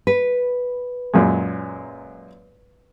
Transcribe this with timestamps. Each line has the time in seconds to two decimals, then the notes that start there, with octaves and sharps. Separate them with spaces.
0.07 B4
1.14 F#2 A#2 G#3